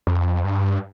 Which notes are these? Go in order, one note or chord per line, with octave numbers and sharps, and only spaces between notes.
F2
G2